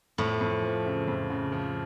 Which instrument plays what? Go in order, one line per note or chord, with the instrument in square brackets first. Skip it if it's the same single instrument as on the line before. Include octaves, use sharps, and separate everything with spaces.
[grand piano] F2 [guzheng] A2
[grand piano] F2
F3
C#3
F2
C#3
F3